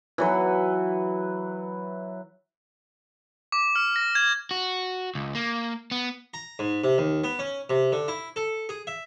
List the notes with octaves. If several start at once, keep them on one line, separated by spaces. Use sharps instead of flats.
E3 F#3 B4
D6
F6
A#6
G#6
F#4
C#2
A#3
B3
A#5
G#2
C3
D#2
B3
C#4
C3
D3
E4
A4
G#4
E5